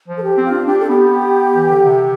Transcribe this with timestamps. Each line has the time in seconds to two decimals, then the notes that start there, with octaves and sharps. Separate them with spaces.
0.08 F3
0.17 A4
0.22 G4
0.37 C4
0.44 F4
0.51 D4
0.66 D4 G4
0.78 A4
0.89 B3 G4
1.56 E3
1.71 D3
1.84 C3